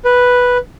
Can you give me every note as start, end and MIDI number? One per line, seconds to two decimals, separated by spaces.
0.05 0.58 71